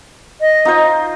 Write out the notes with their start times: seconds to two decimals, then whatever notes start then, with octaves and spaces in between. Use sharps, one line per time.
0.41 D#5
0.65 D#4 F4 C5